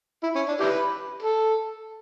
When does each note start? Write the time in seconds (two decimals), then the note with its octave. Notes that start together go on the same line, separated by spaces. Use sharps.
0.23 E4
0.35 C#4
0.48 D4
0.61 E4 G4 B4
1.23 A4